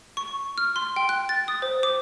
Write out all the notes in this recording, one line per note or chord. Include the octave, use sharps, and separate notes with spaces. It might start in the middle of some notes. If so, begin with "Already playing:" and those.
C#6
F6
C6
G5
F#6
A6
D#6
C5
D6